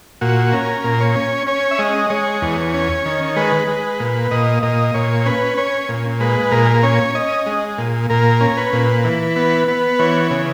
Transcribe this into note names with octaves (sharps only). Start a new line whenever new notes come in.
A#2 F#4
C#4 A#4
A#2
C#5
C#4
C#4 C#5
E5
G#3 D#5
G#3 C#5
E2
C#4
D#3
G#3 B4
G#3
A#2
A#2 D#5
A#2 D#5
A#2 C#5
C#4 B4
C#4 C#5
A#2
G#3 B4
A#2 A#4
C#4 C#5
C#4 D#5
G#3
A#2
A#2 A#4
C#4
B4
A#2
E3
B3
B3
E3 C#5
C#3